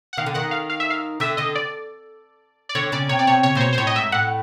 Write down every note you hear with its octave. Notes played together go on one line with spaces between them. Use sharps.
F#5
D#3 F5
D3
D#3 F#5
F5
F5
E5
F5
D3 E5
D3 D#5
D5
D5
D3 C#5
C#3 D5
C3 C#5
D5
C3 C#5
C#3 C#5
A#2 C5
B2 C#5
A#2 C5
A2 C#5
D#5
G#2 E5
A2 F#5